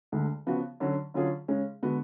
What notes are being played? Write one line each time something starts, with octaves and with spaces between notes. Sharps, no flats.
D2 D3 G#3
C#3 F3 B3 F#4
D3 F#3 C#4 F#4
D3 F#3 C#4 F4 G#4
C#3 G#3 C#4
D3 G#3 B3 F#4